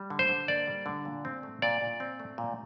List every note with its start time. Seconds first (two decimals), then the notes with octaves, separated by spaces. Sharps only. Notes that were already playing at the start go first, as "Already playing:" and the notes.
Already playing: G3
0.10 D3
0.19 C5
0.29 D3
0.48 A#3 D5
0.67 G3
0.86 D3
1.05 A#2
1.25 C4
1.43 A3
1.62 A#2 D5
1.81 A#2
2.00 C4
2.20 A3
2.38 A#2